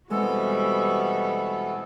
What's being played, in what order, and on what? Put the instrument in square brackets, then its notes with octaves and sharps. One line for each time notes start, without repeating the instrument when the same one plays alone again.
[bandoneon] B2 E3 B3 [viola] G3 F#4 [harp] G#3 C4 [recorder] A4